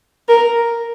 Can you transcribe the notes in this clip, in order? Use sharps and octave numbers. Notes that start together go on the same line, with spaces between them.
A#4